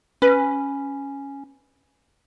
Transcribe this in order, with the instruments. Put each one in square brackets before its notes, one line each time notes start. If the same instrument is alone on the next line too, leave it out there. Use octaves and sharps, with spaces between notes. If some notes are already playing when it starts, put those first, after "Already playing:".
[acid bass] C#4 [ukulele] B4